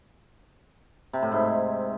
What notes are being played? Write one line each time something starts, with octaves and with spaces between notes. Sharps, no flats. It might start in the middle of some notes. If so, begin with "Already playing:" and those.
C3
A2
G#2